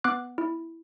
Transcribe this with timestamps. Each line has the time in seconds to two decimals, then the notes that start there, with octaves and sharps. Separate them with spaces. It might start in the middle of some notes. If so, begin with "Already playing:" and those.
0.04 B3 D6 F#6
0.38 E4